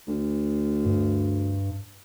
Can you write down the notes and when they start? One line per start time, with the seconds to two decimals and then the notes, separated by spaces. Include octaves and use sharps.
0.07 D2
0.85 G2